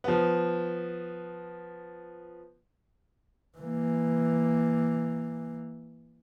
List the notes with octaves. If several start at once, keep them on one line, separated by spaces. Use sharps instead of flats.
F3 B3
E3 A#3